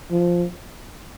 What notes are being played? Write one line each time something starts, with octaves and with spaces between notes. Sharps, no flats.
F3